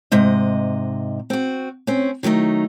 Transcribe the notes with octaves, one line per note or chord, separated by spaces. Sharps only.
G#2 C3 D#5
C4 F#4
C4 C#4
D#3 F#3 A3 D#4